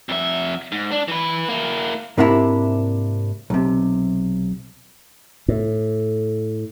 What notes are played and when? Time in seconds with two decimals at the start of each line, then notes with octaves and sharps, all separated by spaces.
0.09 F2 E5
0.72 G#2
0.91 D4
1.08 E3 B4
1.48 A#3 E4
2.18 G#2 C3 A#3 D4 E4
3.50 B1 C3
5.48 A2